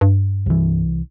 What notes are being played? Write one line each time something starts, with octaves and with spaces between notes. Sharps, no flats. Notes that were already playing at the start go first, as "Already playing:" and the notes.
G2
C2 E3